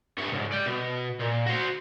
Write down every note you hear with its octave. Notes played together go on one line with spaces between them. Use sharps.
G2 C#5
C#2 G#2
D5 G5
B2
A#2
F#4 C5